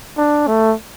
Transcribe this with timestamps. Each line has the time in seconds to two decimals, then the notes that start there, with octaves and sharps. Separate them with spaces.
0.17 D4
0.47 A3